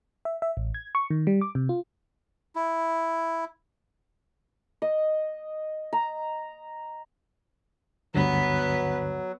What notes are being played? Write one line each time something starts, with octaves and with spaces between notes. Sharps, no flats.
E5
E5
A1
G#6
C#6
D#3
G3
D6
C3
F4
E4
D#5
A#5
D2 G2 D3 F#3 B3 B4